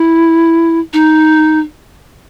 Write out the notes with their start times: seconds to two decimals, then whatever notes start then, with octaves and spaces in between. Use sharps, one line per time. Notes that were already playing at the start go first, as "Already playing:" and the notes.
Already playing: E4
0.93 D#4